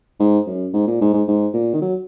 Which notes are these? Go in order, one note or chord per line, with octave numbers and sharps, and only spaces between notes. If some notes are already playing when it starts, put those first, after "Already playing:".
G#2
F#2
G#2
A#2
G#2
G#2
G#2
A#2
D#3
F#3